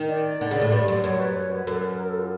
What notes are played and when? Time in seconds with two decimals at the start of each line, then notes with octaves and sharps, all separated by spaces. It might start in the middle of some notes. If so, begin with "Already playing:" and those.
Already playing: D#3
0.09 D5
0.41 D3
0.51 C#3
0.62 A2
0.72 G2
0.88 F#2
0.95 D5
1.04 F#2 C#5
1.20 B4
1.36 C#5
1.52 B4
1.67 F#2 A4
1.78 B4
1.88 A#4
1.98 A#4
2.09 A4
2.20 F4